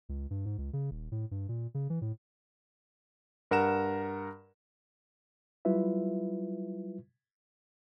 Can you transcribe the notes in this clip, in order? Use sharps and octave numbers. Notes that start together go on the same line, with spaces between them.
C#2
G2
G#2
C#2
C#3
D#1
A2
G2
A#2
C#3
E3
A2
G2 A#4 F#5 A#5 E7
F#3 G3 E4 F4 B4 E5